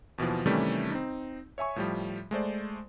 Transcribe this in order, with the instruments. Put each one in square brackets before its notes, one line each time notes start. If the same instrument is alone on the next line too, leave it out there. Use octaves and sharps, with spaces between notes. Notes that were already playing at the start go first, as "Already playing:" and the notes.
[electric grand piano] D#2 B2 E3 F3
C3 D#3 E3 G3 A3 C#4
C4 D#4
C#5 E5 G#5 C#6
A2 F3 G3
G#3 A3 C5 D5